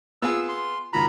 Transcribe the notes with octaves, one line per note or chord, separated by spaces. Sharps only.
B3 F4 G#4 E6
C6
C#2 D#3 F#4 A#5 B5